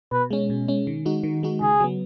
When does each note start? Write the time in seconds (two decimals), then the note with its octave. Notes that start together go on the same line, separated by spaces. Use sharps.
0.12 B2 B4
0.31 G#3 C#4
0.50 B2
0.68 G#3 C#4
0.87 D#3
1.05 G#3 D#4 F#4
1.23 D#3
1.43 G#3 D#4 F#4
1.61 C#3 G#4
1.80 F#3 B3